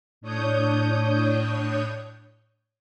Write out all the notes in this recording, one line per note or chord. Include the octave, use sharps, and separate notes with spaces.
A2 D4 C#5 D#6 G6